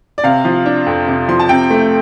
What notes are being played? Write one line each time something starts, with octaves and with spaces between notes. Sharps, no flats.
D5
C3 F5
F3
D4
F2
C3
F3 C6
A5
C3 G5
A3